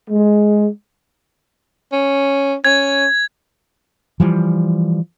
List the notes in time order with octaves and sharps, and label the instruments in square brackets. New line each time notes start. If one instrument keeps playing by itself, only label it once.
[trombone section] G#3
[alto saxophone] C#4
[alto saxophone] C#4 [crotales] G#6
[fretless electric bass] E3 F3 G3